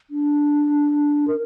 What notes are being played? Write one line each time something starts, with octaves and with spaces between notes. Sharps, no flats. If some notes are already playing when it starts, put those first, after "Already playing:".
D4
A#4